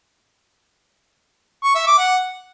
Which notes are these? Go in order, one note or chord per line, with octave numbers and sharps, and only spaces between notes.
C#6
E5
D6
F#5